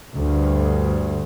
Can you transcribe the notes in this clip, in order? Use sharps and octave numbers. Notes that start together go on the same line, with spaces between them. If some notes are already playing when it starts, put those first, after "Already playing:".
D2 G2